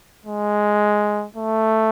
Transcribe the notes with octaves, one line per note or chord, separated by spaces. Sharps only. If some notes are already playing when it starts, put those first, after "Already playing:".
G#3
A3